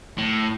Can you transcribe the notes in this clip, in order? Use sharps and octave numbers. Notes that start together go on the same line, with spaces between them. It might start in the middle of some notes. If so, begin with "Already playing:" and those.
A2